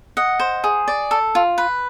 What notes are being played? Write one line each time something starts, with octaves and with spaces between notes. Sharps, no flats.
D#5 F#5
C5
G#4
D5
A4
F4
B4